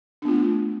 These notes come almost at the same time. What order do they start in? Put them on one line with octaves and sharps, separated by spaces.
D4 B3 F4 A3